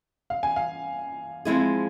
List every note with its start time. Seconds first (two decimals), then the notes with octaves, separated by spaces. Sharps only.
0.30 F5
0.43 G#5
0.56 F5
1.45 F3 G#3 C4 E4 G#4